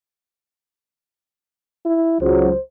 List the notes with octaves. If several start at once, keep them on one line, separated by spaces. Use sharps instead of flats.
E4
C#2 F#3 C5